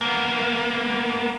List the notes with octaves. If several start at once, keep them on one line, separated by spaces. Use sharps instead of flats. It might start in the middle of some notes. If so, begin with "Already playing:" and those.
A#3 B3